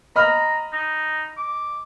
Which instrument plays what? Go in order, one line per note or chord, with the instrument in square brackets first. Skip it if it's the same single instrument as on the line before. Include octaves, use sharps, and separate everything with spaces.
[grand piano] D#5 B5 F6 [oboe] A#5
[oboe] D#4
D6